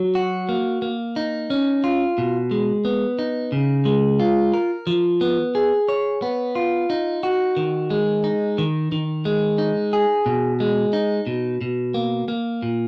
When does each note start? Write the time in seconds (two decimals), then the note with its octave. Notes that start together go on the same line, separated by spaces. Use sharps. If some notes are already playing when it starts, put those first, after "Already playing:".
Already playing: F#3
0.15 F#4
0.49 A#3
0.82 A#3
1.16 D#4
1.50 C#4
1.84 F4
2.18 B2
2.51 G#3
2.85 B3
3.19 D#4
3.52 C#3
3.85 G#3
4.20 F4
4.54 A#4
4.87 F3
5.21 B3
5.55 G#4
5.89 C#5
6.22 B3
6.55 F4
6.90 D#4
7.23 F#4
7.57 D#3
7.90 G#3
8.24 D#4
8.58 D#3
8.92 D#3
9.25 G#3
9.58 D#4
9.93 G#4
10.26 B2
10.60 G#3
10.93 D#4
11.27 B2
11.61 B2
11.94 A#3
12.28 A#3
12.62 A#2